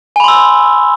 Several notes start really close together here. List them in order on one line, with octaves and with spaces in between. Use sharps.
G#5 B5 C6 E6